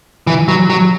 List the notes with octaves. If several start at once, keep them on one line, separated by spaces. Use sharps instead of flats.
E3
F#3
F#3